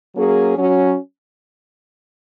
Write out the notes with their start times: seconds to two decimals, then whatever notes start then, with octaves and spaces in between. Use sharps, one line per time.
0.16 F#3 A#3 C#4 G#4
0.57 F#3 C#4 F#4